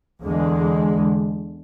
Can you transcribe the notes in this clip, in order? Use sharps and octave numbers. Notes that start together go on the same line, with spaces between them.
E2 D3 G#3